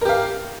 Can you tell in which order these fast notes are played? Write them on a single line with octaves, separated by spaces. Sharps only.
A#4 G4 F5